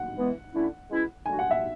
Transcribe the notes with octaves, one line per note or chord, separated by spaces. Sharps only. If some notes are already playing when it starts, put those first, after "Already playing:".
Already playing: F#5
E3 G#3 B3
D3 A3 C#4 E4
B2 G#3 C#4 E4
D3 G#3 D4 F#4 G#5
F#5
E5